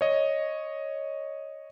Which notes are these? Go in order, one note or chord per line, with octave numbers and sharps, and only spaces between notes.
C#5 D#5